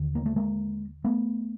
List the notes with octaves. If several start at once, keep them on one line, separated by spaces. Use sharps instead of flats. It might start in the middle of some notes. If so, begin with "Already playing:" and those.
Already playing: D#2 D3
A#3
A3
G#3 A#3
A3 B3